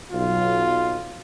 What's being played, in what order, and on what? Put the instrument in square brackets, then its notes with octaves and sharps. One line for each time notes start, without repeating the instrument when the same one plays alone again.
[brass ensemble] B1 F4